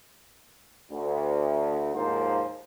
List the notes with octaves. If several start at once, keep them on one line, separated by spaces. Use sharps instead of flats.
D2
D#2 G#2 F3 A#3 C5